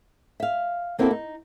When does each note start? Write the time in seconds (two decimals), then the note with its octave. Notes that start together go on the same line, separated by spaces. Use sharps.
0.40 E5 F5
0.99 A#3 C4 E4 F#4 G#4 A4
1.11 D#4